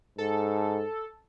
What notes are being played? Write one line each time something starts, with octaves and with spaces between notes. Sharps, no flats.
G#2 A4